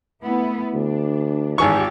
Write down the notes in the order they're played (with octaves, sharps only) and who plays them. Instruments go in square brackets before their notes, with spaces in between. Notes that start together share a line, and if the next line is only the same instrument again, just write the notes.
[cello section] A3 B3 E4
[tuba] D2 [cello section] D4
[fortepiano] G#1 G#4 C#6 [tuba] E3 [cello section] F4 G4